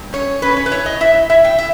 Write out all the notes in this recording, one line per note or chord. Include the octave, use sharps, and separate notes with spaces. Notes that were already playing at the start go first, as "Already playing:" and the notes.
Already playing: G2
C#4 C#5
C#4 B4
C#5
B4
E4 C#5
D#5
E4 E5
E4 E5
G5
E5